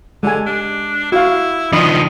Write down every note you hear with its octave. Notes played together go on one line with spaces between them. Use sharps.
D3 G#3 G4 G#5
D4
E4 F#4 F5
D#3 F3 D4 D#5 B5